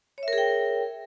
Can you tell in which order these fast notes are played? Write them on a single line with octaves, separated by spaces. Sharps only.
C#5 E5 A#4 G#4 G5